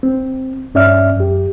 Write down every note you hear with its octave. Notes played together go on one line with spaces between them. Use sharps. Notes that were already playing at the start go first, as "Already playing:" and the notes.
C4
G2 C#4 D5 E5 F6
F#2 G4